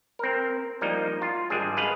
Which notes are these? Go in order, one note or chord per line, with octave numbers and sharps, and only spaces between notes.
C4 A#4
F3 G3 A#3 D#4
F4
G#1 G3 G#3 D4 G#4
G#4 B4 D#5 F5